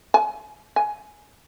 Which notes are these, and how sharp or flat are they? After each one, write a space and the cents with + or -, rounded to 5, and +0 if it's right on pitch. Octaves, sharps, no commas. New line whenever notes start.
G#5 +35
G#5 +20